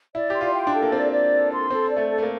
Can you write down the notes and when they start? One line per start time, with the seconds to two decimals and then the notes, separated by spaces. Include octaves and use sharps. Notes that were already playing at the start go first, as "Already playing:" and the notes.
0.14 E4 D5
0.30 G4 C6
0.41 F4
0.54 G5
0.67 D4
0.73 A4
0.82 A#3
0.92 C4 D5
1.11 D5
1.32 A4
1.52 C6
1.70 C4 A4
1.89 D5
1.97 A3
2.09 A4
2.18 A3
2.23 A#3